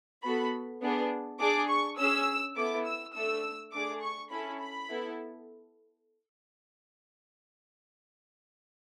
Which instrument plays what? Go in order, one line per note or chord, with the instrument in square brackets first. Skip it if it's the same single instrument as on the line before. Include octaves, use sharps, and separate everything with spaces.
[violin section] B3 F#4 A4 B5
B3 D4 G#4
D4 G#4 D6
C#6
C#4 G#4 E6
B3 E4 A4 D6
E6
A3 D4 A4 E6
A3 D4 G#4 D6
C#6
C#4 E4 A4 B5
B5
B3 E4 A4